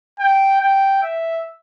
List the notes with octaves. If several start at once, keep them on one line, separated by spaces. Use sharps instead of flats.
G5
G5
E5